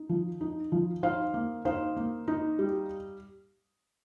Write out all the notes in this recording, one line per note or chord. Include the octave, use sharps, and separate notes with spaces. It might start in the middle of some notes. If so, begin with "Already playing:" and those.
Already playing: D#4
F3
D#4
F3
D#4 C5 F5
A#3
D#4 C5 F5
A#3
D#4
G3